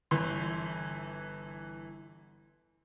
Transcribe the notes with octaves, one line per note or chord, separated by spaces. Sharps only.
G1 E3 C6